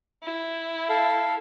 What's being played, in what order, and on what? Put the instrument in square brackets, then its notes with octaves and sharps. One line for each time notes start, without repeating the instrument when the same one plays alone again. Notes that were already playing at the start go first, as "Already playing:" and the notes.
[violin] E4
[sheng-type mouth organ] A4 F5